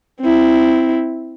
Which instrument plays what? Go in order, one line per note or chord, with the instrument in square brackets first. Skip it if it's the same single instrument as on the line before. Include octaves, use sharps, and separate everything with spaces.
[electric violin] C4 E4